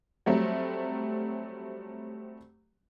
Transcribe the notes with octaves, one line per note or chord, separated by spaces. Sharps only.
F#3 G3 A3 C4